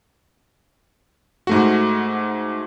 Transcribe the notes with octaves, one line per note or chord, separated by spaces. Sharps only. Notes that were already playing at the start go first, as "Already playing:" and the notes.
G#2 A3 F#4